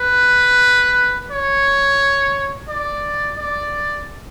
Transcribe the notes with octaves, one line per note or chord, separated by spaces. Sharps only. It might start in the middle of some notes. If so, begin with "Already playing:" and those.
Already playing: B4
C#5
D5
D5